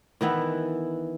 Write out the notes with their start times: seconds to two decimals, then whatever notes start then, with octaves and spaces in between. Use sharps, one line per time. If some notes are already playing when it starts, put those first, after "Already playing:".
0.21 D#3 E3 B3 E4